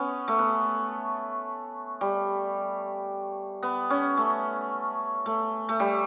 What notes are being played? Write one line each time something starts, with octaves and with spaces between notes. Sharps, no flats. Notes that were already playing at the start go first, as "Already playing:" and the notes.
Already playing: B3 C#4
A3
B3
G3
B3
C#4
A3
A3
A3
G3